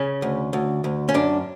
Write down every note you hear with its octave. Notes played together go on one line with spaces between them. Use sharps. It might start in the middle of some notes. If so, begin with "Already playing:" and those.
Already playing: C#3 C#4
D2
D2
D2
C#4
F#2 D4